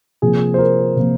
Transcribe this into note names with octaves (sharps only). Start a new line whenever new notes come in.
C3 F3 A#3 G#4
C5
A#4
C3 F3 A#3